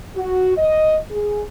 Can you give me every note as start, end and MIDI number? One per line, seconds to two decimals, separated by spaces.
0.15 0.54 66
0.57 0.97 75
1.10 1.42 68